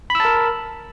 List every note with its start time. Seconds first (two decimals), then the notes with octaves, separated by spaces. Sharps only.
0.10 B5
0.15 E6
0.20 A5
0.25 A#4